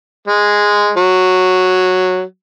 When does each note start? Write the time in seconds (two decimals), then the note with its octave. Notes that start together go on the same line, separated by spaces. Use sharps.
0.28 G#3
0.97 F#3